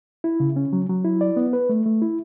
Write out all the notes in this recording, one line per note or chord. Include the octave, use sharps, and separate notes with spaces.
E4
C#3
C#4
F#3
F#3
E4
D5
B3
B4
A3
A3
E4